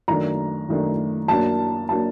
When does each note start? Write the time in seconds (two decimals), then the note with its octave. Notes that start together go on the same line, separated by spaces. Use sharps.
0.08 F#2 D#3 A3 D4 A#5
0.69 F#2 D#3 A3 D4
1.28 F#2 F#3 A#3 D4 A5
1.89 F#3 A#3 D4 A5